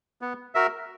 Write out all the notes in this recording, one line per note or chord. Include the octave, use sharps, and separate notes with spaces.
B3
F#4 A#4 E5